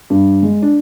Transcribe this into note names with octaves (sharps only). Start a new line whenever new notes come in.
G2
G#3
D4